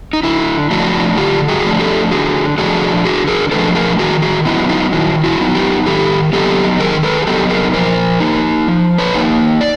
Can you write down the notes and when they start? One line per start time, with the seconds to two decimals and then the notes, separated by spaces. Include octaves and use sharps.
0.13 D#4
0.23 D3 E4
0.70 F3 A3 D4 E4 F#4
1.17 D3 F4 G4
1.48 F#4 G#4
1.64 F3 A3 D4
1.79 G4 A4
2.11 D3 F#4 G#4
2.58 F3 A3 D4 F#4 G#4
3.05 D3 F#4 G#4
3.28 G#4 A#4
3.51 F3 A3 D4 A4 B4
3.75 G#4 A#4
3.99 D#3 F#4 G#4
4.22 F#4 G#4
4.45 F#3 B3 D#4 E4 F#4
4.69 D#4 F4
4.93 D#3 E4 F#4
5.24 E4 F#4
5.40 F#3 B3 D#4
5.55 F4 G4
5.86 D#3 G4 A4
6.33 F#3 B3 D#4 G4 A4
6.79 D#3 G#4 A#4
7.03 A4 B4
7.22 G#4
7.27 F#3 B3 D#4 G4 A4
7.50 G#4 A#4
7.74 F3 A#4 C5
8.20 A#3 D#4
8.68 F3
8.98 B4 C#5
9.15 A#3 D#4
9.61 D5